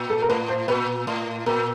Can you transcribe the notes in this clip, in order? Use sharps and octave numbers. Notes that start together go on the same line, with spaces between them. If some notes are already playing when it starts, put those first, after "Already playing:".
Already playing: A#2
A4
A#4
A2 B4
C5
A#2 B4
A2
A#2 A#4